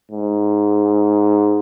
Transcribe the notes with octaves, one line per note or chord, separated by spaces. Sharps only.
G#2